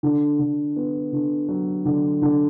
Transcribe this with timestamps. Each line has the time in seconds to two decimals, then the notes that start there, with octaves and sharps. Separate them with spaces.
0.03 D3
0.39 D3
0.76 B3
1.12 D3
1.48 F#3
1.85 D3
2.22 D3